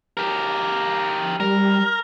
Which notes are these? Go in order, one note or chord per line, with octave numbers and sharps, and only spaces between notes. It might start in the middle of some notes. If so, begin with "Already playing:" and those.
G4 A#4
G3 A#4